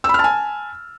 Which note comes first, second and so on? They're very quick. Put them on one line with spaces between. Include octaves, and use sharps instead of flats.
E6 B5 F6 A5 G#5